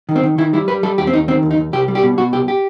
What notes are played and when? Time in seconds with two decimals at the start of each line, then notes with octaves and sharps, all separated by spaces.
0.09 D#3
0.16 C4
0.23 D#3
0.38 D#3 E4
0.53 G3 E4
0.68 G3 B4
0.83 G3 A4
0.98 D#2 G4
1.07 C4
1.13 D#2 D#4
1.28 D#3 C4
1.43 D#2
1.51 D#4
1.58 D#2
1.73 C2 G4
1.88 G3
1.95 G4
2.03 B2
2.18 B2 F#4
2.33 C2 G4
2.48 G4